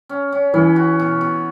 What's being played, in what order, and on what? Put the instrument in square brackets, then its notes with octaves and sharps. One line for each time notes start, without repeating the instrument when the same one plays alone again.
[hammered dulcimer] C#4
C#4
[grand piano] E3 [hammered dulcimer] C#4
[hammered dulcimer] F#4
B2
B2